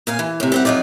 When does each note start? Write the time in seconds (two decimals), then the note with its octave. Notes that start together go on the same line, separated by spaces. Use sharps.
0.07 A#2 F5 G#5
0.19 E3
0.40 A2 C3
0.52 G3 C4 F#5
0.65 F2 F#3 D#4 F4 D5